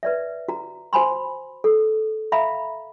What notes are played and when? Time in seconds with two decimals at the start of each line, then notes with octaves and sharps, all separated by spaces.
0.03 B4 D5 E5
0.48 F#4 A#5
0.93 F#4 C5 G#5 B5 C6
1.64 A4
2.32 E5 F5 A#5 B5